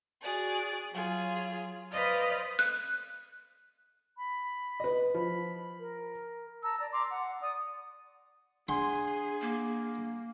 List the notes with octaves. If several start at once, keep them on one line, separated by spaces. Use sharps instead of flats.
F#4 G#4 D5
F#3 F4 G#4
B4 C5 D5 D#5 F5 F6
F#6
B5
B4 D#5
F3 B5
A#4
A5 A#5 E6
D5 A#5
A#5 C6 D6
F#5
D5 D#6
D4 G#4 F#5 G#5 C6
A#3